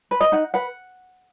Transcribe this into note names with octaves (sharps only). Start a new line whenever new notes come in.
B4
D#5
D#4 F#5
B4 F#5